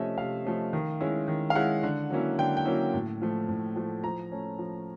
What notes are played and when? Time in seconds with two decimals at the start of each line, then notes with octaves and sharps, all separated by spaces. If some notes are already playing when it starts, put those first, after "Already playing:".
Already playing: C3 F3 A3 C#4 D#5 E5
0.18 C3 F5
0.45 F3 A3 C#4
0.73 D#3
1.01 G#3 C#4 E4
1.28 D#3
1.50 F5
1.55 G#3 C#4 E4 F#5
1.83 D3
2.10 F#3 A#3 C#4 E4
2.38 D3 G5
2.57 G5
2.66 F#3 A#3 C#4 E4
2.94 A2
3.22 F3 A3
3.49 A2
3.76 F3 A3
4.04 F3 A#5
4.32 A3 C#4
4.59 F3